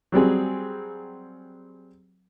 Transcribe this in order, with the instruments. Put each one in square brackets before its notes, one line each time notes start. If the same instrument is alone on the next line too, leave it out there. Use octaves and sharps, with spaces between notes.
[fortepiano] F#3 G3 C4 G#4